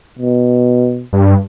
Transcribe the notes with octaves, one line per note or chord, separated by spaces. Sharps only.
B2
G2